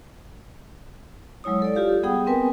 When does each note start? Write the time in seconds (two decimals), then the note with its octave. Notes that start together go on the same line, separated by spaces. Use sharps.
1.44 F#3 G#3 E4 C#5 D#6
1.62 A4 D5
1.75 F4 G4 F5
2.03 G3 B3 G#4 F#5 G5 D#6
2.26 B3 C4 A#4 B4 G5 G#5